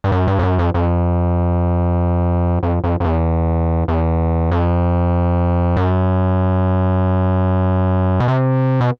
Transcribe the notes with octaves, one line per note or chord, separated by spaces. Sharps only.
G2
F#2
G2
F2
F#2
F2
F2
F2
F2
F2
E2
E2
F2
F#2
B2
C3
B2